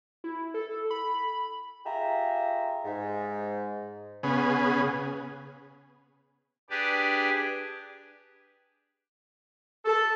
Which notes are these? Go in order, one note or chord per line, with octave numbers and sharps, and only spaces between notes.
E4
A4
B5
F4 G4 G#4 E5 A#5
G#2
C#3 B3 G#4
D4 G4 G#4 B4 D5
A4